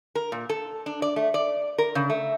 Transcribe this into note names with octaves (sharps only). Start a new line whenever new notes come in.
A#4
A#2
A4
D4
D5
A3
D5
A#4
C#3
A3